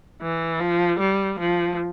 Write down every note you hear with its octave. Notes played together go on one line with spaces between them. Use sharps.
E3
F3
G3
F3